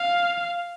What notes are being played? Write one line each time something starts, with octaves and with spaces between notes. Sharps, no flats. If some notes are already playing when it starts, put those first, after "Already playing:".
Already playing: F5